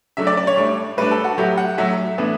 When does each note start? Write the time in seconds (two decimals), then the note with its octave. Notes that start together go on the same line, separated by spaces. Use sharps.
0.17 C#3 F#3 A3 D4 E5
0.27 D5
0.37 D5
0.47 C#5
0.57 A2 G3 D4
0.97 A2 G3 D4 B4
1.11 A4
1.24 F#4
1.38 A2 F#3 A3 G4
1.58 F#5
1.78 A2 F#3 A3 E5
2.18 A2 E3 B3 D4